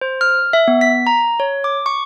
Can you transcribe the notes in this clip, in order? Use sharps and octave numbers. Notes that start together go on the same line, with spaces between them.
C5
F6
E5
B3
B6
A#5
C#5
D6
C#6